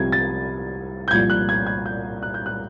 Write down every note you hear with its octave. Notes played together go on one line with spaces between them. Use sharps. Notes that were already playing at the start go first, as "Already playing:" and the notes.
Already playing: C2 C3 F3 G#6
A6
G6
C2 A#2 F3 G#6
F#6
G#6
G#6
G6
F#6
G6
F#6